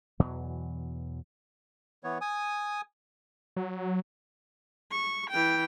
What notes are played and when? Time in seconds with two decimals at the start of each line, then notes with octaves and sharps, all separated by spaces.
0.19 E2 B2 E3 F#3
2.04 E3 B3 C#5
2.21 G#5 D#6
3.56 F#3
4.91 C#6
5.30 E3 G5